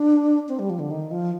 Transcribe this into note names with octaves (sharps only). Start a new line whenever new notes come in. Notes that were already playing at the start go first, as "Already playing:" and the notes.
Already playing: D4
C4
G3
F3
D3
D#3
F3